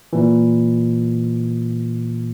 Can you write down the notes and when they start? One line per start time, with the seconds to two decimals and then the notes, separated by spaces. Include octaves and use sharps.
0.13 A#2 E3